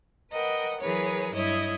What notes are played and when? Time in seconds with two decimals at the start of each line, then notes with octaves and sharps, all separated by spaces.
0.31 A#4 B4 D#5 F#5 G5
0.81 E3 F#3 G#4 A#4 B4 C#5
1.32 G2 E4 C#5 D#5 G#6